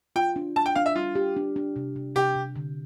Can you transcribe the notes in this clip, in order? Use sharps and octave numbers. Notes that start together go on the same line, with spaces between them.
F4 G5
D4
D4 A5
G5
D4 F5
E5
G3 F4
G4
D4
D4
C3
C3
C3 G4
C3
D3